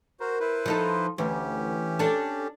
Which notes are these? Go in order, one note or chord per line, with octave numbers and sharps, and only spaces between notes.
F#4 A#4 C5
E4 B4 C5
F3 D#4 A4
D2 E3 C#4 G4
D4 A4